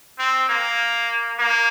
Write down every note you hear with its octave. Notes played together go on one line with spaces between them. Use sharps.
C4
A#3
A#3